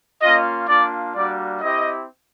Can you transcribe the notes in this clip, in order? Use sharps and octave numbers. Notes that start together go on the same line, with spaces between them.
A#3 C#4 F4 D#5
A#3 D4 F4 D5
G3 A#3 D4 F#4 D5
C4 E4 G4 D#5